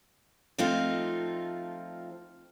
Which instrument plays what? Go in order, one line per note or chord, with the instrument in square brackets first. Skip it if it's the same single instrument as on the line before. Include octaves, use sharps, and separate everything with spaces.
[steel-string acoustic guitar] F3 A3 C4 D#4 F4